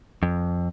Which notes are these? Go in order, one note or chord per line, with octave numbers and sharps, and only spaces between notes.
F2